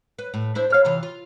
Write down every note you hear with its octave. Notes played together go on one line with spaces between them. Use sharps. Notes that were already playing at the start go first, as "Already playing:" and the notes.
B4
A2
D4 E4 C5
C#5 F5
C3 E3 F4
F4